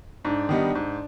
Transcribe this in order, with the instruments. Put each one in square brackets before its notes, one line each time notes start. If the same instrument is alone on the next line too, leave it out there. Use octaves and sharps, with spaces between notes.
[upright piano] G#2 [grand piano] D4
[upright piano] D#3 G3 B3 D#4
G#2